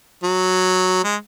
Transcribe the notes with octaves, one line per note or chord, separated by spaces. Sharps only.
F#3
G#3